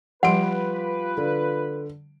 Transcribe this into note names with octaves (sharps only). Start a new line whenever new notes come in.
F3 G3 F4 G4 B4 F#5 C6 D7
D3